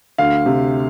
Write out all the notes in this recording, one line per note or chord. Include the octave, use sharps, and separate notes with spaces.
D2 F5
C3